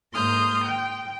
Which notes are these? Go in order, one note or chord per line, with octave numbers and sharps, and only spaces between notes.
G#2 A#3 C6 D#6 F6 G6
G5